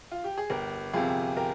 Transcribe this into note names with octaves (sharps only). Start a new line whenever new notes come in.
F4
G4
G#4
G1 G4 A#4
F2 C3 F4 G#4
G4 A#4